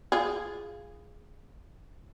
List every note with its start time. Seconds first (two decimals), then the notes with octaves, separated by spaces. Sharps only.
0.12 F4 G#4